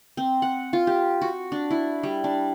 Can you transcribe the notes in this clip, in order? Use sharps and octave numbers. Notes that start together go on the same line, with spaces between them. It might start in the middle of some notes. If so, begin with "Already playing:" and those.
C4
F#5
F4
G4
F#4
D4
E4
G3
D4